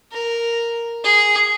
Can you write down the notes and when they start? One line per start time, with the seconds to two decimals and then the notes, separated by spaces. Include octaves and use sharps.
0.12 A#4
1.04 G#4